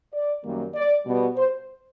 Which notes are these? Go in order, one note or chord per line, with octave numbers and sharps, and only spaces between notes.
D5
F#2 D#3 G3 A#3
D5
B2 G3 B3
C5